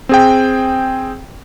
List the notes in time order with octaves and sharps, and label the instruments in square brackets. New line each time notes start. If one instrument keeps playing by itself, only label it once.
[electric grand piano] C4 G#4 G5